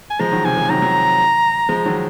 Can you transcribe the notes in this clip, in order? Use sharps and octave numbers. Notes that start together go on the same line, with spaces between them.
G#5
F3 G#3 A#5
D#3 F#3
C3 D#3 G#5
F3 G#3
D#3 F#3 A#5
D#3 F#3
F3 G#3
D#3 F#3